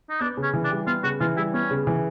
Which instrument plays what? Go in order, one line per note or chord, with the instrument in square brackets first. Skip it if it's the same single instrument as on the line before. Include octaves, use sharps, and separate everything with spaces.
[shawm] D#4
[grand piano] B3 [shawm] D4
[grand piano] C#3
[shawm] C#4
[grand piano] E3
[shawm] D4
[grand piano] G3
[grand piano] B3 [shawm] F4
[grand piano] C#3 [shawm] F#4
[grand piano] E3 [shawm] F4
[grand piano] G3 [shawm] E4
[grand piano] B3 [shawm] C#4
[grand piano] C#3
E3